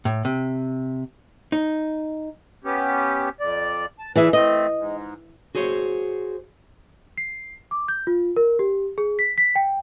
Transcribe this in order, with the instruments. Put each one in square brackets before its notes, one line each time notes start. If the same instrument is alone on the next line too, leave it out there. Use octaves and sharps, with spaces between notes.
[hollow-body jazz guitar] A2
C3
D#4
[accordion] B3 C#4 G4
F2 D5
A5
[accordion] A#2 B4 [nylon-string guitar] E3 G#4 E5
[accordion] A3 C4 [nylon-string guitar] D#5
[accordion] G#2
[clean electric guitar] F#4 G#4 C5 C#5
[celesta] C7
D6
G6
F4
A#4
G4
G#4
B6
B6
G5